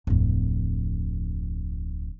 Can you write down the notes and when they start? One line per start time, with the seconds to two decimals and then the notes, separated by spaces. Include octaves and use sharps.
0.07 D1 F2